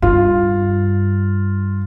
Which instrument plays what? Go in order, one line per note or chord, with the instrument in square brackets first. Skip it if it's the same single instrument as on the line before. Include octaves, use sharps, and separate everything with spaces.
[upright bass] G2 [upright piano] F4